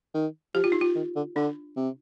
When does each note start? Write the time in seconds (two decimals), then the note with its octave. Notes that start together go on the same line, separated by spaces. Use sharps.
0.14 D#3
0.55 F3 G4
0.64 F4
0.72 D#4
0.81 F4
0.95 D#3
1.16 D3
1.36 D3 D4
1.76 C3